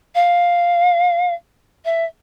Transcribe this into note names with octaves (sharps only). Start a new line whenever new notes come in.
F5
E5